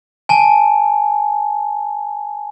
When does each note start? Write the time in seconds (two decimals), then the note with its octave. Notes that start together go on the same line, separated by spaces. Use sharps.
0.29 G#5 A5